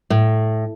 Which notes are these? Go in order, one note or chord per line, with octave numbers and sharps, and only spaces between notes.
A2